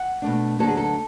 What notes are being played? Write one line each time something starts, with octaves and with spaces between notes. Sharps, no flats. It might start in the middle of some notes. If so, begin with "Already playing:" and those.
Already playing: F#5
B2 A3 D4
D2 D3 F#3 B3 D4 A4
G#4
A4